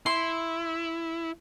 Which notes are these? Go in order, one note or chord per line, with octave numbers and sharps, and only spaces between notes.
E4 C6